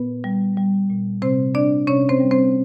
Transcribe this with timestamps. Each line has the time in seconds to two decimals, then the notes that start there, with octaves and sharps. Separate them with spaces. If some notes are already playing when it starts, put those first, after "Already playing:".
Already playing: A#2 B3 B4
0.24 G3
0.57 G3
0.90 A#2
1.22 C3 C4 C5
1.55 C3 D4 D5
1.87 C3 C#4 C#5
2.09 C4 C5
2.20 G3
2.31 C4 C5